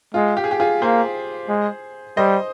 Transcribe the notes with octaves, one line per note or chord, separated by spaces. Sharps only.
G#3 F4
G4
G#4
G4
F4 G#4
A#3 G#4 C5
G#3
G3 C5 D#5